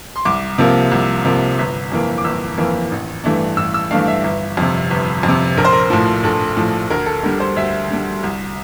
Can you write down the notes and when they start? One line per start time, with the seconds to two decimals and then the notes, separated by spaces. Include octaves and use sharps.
0.16 C6
0.25 C2 D6
0.58 C3 F3 A#3
0.91 C2
1.25 C3 F3 A#3
1.59 G1
1.92 F2 E3 A#3
2.18 D6
2.24 G1 E6
2.58 F2 E3 A#3
2.92 A1
3.24 G2 E3 A3 D4
3.57 A1 E6
3.74 E6
3.91 G2 E3 A3 D4 F5
4.08 E5
4.24 G1
4.57 F2 C3
4.91 G1
5.23 F2
5.29 C3
5.57 A#1 A#4
5.65 C5
5.73 A#4
5.90 A2 F3
6.23 A#1 A4
6.57 A2 F3
6.90 D2 A#4
7.06 A4
7.23 D3 G3 A#4
7.40 C5
7.56 D2 E5
7.90 D3 G3
8.24 C2